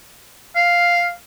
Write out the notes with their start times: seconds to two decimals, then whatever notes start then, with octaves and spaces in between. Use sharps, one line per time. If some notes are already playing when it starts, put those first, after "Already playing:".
0.56 F5